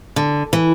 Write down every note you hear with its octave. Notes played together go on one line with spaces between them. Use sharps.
D3
E3